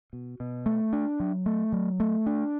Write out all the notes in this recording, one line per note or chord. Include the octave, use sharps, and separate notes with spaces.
B2
B2
A3
D4
F#3
A3
F#3
A3
D4